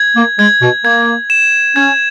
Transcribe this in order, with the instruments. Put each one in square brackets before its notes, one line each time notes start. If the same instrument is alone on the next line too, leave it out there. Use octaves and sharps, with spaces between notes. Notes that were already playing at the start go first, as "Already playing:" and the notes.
Already playing: [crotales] G#6
[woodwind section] A#3
[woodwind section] G#3 [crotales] G#6
[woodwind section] B2
[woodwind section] A#3 [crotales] G#6
[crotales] E7
[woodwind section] C#4 [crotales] G#6